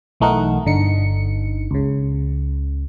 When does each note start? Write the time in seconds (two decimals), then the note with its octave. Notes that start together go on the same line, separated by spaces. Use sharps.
0.20 B1 E3 A3 D#4 A#4 F#5
0.66 G1 D3 D#4 C#7
1.71 C#2 C#3